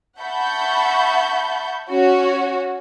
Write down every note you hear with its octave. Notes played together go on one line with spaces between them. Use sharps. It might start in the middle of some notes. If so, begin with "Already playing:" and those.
E5 F#5 A5 B5 C#6 G6
C#4 F#4 C#5